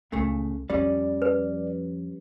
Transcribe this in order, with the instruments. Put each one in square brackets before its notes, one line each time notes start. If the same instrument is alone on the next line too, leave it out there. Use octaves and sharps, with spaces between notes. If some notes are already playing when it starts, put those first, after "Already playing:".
[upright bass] C#2 [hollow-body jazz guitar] A#2 C#3 A3
[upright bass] F2 F3 [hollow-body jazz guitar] G3 C#4 [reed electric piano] D5
[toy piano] B4